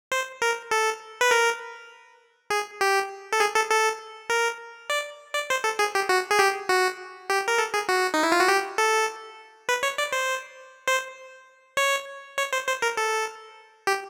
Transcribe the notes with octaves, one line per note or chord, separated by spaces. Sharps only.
C5
A#4
A4
B4
A#4
G#4
G4
A4
G#4
A4
A4
A#4
D5
D5
C5
A4
G#4
G4
F#4
G#4
G4
F#4
G4
A#4
A4
G#4
F#4
D#4
E4
F4
F#4
G4
A4
B4
C#5
D5
C5
C5
C#5
C#5
C5
C5
A#4
A4
G4